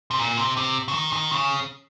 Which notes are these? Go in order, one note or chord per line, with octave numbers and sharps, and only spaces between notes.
C3
A#2
C3
C3
C#3
D#3
D#3
C#3